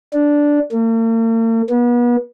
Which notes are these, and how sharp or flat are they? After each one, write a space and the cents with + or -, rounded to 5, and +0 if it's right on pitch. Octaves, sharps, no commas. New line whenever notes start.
D4 -5
A#3 -45
B3 -35